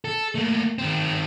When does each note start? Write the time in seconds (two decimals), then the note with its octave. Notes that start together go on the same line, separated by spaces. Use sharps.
0.05 A4
0.35 A3 A#3
0.78 D#3 C4